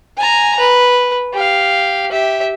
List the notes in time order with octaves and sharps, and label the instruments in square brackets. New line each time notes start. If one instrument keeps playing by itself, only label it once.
[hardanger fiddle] G#5 A#5
B4
G4 F5
G4 E5